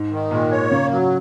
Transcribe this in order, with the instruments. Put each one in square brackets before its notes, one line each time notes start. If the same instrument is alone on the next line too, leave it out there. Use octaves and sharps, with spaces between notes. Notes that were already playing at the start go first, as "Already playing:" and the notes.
Already playing: [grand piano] G#2
[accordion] D#3
[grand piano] A#2 [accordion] G#3
[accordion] C#5
[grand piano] C#3 [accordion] A#3
[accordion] F#3